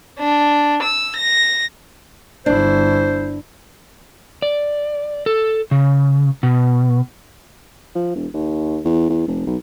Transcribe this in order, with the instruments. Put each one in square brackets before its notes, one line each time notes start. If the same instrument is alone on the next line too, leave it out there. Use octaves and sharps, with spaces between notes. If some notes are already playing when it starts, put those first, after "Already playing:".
[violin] D4
E6
A#6
[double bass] G1 E4 [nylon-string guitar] D4 [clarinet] C5
[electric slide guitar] D5
A4
C#3
B2
[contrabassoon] F3
E1
D#2
E2
E2
F1
B1